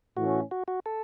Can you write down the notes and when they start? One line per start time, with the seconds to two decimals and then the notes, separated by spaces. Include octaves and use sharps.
0.17 A2 E3 A3 C#4 F#4
0.51 F#4
0.68 F#4
0.86 A4